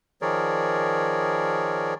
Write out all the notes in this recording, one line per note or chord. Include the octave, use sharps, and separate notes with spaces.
D#3 F3 G#4 A#4 C#5 D5